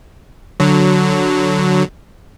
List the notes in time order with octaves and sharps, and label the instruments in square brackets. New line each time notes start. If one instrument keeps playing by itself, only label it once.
[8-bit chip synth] D3 F#3